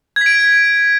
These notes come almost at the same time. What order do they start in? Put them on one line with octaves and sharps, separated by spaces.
G#6 B6 D7